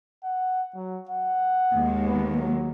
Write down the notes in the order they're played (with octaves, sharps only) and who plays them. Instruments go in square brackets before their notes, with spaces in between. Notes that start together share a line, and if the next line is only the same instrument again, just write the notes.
[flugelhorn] F#5
F#3
F#5
[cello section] D#2 G#3
[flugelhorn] B3
F#3